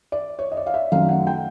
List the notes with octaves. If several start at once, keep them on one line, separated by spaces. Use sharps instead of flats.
D5
C#5
D#5
D5
F5
E5
F#2 D#3 F#3 A3 F5
F#5
G5